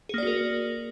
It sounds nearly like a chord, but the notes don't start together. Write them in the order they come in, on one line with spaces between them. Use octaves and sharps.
G#4 A#3 D5 F#4 A#4